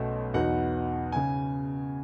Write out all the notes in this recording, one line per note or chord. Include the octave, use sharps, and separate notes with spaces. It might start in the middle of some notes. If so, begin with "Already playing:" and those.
Already playing: B1 B2 A3 C#4
E2 B2 F#3 B3 D#4 F#5
C#3 G#5